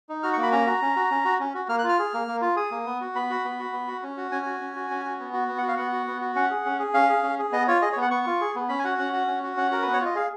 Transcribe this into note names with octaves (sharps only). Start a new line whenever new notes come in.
D#4
F#4 F6
C#6
A#3
B5
C#4 A#5
F#4
C#4
F#4
C#4
F#4
C#4
F#4
A#3 F6
F#6
F4
F6
G#4
A#3
A#3
F4
G#4 D#6
A#3
B3
F#4
B3 B5
F#4
B3
F#4
B3
F#4
C#4
F#4
C#4 G#5
F#4
C#4
F#4
C#4
F#4
B3
F#4
B3
F#5
F#4
F5
B3 F#5
F#4
B3
F#4
C#4 F#5
G#4
C#4
G#4
C#4 F5
G#4
C#4
G#4
B3 D#5
F4 C#5
G#4 D#5
C#5
B3
F#5
B3 C#6
F4
G#4
B3
C#4 B5
G#5
F#4 F#5
C#4 F#5
F#4
C#4
F#4
C#4 F#5
F#4 A#4
B3 B4
C#5
F4 D#5
G#4 F5